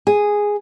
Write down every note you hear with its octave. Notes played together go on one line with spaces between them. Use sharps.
G#4